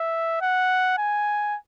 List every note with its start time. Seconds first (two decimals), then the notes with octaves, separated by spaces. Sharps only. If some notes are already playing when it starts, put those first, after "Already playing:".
Already playing: E5
0.42 F#5
0.98 G#5